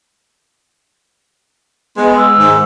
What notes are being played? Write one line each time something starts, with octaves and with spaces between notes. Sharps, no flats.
G#3 B3 C6
E6
G#2 D#3